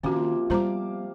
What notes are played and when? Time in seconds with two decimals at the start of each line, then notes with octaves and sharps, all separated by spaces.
0.03 C3 D#3 F3 A#3 C#4 F#4
0.50 G3 B3 F4 C5 F5 A#5 D6